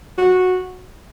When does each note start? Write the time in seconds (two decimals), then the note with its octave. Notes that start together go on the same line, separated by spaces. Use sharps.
0.18 F#4